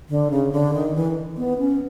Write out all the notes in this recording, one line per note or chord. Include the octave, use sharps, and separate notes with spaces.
D3
C#3
D3
D#3
E3
B3
C#4